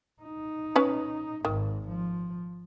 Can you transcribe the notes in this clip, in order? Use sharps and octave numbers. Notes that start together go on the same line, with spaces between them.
D#4
C#4 B4 C#5
G#1 G#2 D#3
F3